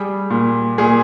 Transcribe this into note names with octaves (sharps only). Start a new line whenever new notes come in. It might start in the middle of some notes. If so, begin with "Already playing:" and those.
Already playing: G3 G#4
A#2
A#2 G#4